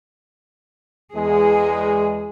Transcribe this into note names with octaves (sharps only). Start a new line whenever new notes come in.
E2 G#3 G#4